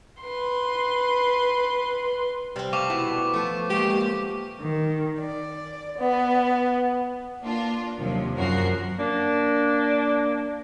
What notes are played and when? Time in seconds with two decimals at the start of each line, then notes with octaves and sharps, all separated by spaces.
0.22 B4 C6
2.56 C3 G3 C4
2.73 A3 F5 C#6 D6
2.90 B2 B3 E4
3.33 F3 A3
3.70 G#3 A#3 G4
4.60 D#3
5.20 D5
5.98 B3
7.42 A#3 D4 F4
7.99 D#2 C3 F3 F#3
8.36 F#2 F3 F#4 A#4 C7
8.98 A#3 D4